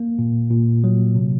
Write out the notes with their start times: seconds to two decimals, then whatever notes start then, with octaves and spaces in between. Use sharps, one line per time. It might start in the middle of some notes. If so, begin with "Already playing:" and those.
Already playing: A#3
0.19 A#2
0.50 A#2
0.84 F#3
1.15 C3